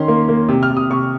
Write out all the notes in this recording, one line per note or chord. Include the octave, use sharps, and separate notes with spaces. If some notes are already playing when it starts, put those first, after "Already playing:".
Already playing: D#3 C#4 C6
A#3
A#3
C3
F6
C3
D#6
C3 C#6